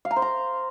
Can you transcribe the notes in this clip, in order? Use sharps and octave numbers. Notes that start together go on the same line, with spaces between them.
F5
A#5
C5
A#5